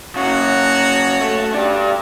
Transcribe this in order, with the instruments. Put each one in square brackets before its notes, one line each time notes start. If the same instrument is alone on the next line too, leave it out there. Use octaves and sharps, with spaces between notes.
[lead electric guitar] F#2 C#3 [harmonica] F#4 C#5
[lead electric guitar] A3
D4 G4